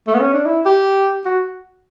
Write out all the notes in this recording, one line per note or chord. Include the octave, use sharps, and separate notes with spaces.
A3
B3
C#4
D4
E4
G4
F#4